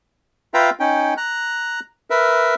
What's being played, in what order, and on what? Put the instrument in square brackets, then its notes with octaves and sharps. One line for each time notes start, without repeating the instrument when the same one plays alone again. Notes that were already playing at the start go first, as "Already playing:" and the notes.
[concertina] F4 B4 E5 F5 G5 A#5
C#4 D#4 G5
A#5 F#6
A#4 B4 E5